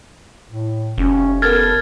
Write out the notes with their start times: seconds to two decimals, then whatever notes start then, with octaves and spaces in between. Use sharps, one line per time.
0.50 A2
0.98 F1 C#4
1.42 B3 A4 A#4 F6 G#6 A6